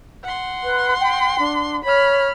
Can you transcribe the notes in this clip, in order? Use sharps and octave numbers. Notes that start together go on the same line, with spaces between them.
F#5 C6
B4
G5
D4
C#5 B5 F6